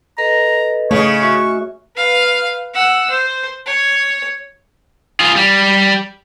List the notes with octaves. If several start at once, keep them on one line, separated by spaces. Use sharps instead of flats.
A4 B4 D#5 A#5
C#3 A3 C#5 D#5
F#4 E5 C#6
B4 F5
F#5 E6
C5
C#5
F4 G#4
G3